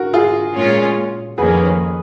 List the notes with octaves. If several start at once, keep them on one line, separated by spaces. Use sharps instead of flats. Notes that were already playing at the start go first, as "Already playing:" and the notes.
Already playing: F#4 A#4
F4 G#4
A#2 G#3 C#4 F4
F2 D#3 A#3 C#4 G#4 B4